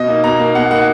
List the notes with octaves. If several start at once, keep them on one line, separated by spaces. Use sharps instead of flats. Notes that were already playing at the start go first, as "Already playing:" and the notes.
Already playing: B2 D#5
A#3 D#4
B2 A#5
A#3 D#4
B2 F#5
A#3 D#4 F#5